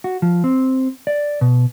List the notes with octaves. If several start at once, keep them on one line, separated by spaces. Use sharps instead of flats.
F#4
F3
C4
D5
B2